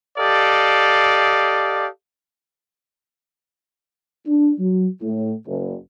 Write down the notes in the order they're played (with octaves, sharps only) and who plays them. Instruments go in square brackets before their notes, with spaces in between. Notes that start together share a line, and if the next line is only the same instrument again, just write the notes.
[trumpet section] G4 A4 D5 D#5 F5
[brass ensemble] D4
F#3
A2
F#1